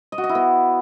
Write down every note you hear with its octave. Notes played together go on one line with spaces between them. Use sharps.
D#5
F#4
D#5
E4
B3